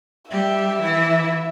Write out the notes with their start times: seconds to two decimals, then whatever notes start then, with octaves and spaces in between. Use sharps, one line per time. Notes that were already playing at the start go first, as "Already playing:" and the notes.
0.30 G3 G4 E5
0.80 E3 E4